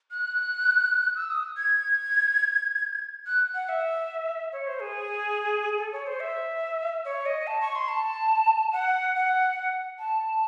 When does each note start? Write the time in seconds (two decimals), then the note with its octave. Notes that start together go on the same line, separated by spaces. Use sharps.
0.11 F#6
1.16 E6
1.30 D#6
1.57 G#6
3.27 F#6
3.55 F#5
3.69 E5
4.53 C#5
4.67 C5
4.81 G#4
5.78 A4
5.92 C#5
6.06 C5
6.20 E5
7.05 C#5
7.26 D#5
7.47 A5
7.61 C#6
7.75 C6
7.88 A5
8.73 F#5
9.15 F#5
9.99 A5